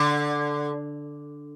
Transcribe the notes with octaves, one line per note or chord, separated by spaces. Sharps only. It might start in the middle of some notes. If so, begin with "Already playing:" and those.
Already playing: D3